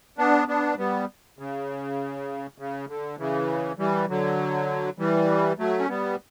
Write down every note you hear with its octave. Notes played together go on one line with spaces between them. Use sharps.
B3 D4
B3 D4
G3 B3
C#3
C#3
D3
C#3 E3
E3 G3
D3 F#3
E3 G3
F#3 A3
C#4
G3 B3